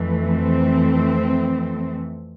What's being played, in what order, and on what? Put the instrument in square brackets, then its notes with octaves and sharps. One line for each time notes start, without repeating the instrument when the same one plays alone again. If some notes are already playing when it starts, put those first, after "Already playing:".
Already playing: [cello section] F2 E3 A3
C4